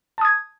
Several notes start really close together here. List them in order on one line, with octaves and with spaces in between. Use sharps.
A5 D#6 G#6